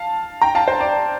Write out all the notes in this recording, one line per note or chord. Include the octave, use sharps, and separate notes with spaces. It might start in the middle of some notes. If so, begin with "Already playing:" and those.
Already playing: F5 A5
G5 A#5
F5 A5
C5
D5